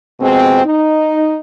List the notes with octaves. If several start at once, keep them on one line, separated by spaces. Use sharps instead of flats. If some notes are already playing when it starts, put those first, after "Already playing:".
F2 B2 G#3 C4
D#4